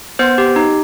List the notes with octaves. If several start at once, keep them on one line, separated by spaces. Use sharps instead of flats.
B3 C5
G4
D#4